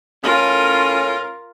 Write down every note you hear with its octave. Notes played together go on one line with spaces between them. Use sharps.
A2 C#4 F4 A#4